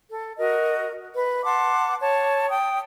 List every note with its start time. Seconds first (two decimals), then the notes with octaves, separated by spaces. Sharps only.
0.11 A4
0.38 F#4 A#4 D#5
1.17 B4
1.44 F#5 A5 C6 D6
2.01 C#5 A5
2.50 G5 D#6